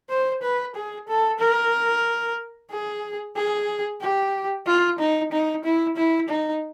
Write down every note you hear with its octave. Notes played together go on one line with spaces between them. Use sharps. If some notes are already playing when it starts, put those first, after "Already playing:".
C5
B4
G#4
A4
A#4
G#4
G#4
G4
F4
D#4
D#4
E4
E4
D#4